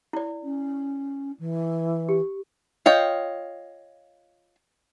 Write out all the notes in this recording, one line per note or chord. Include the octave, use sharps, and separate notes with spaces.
E4 D5
C#4
E3
G4
F4 C#5 D#5 F5 G5